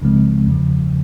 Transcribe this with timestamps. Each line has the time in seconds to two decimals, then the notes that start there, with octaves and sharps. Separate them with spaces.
0.02 C#2 C#3 F3 G#3 C4
0.47 E2 C#3 F3